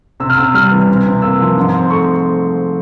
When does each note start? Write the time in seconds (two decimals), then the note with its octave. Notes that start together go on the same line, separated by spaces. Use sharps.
0.20 C3 E6
0.30 F6
0.37 C3 E6
0.54 G3 F6
0.71 E3
0.88 C3
1.06 C3
1.22 A#3 E6
1.39 F3
1.57 G#2
1.74 C4
1.90 A3 C#6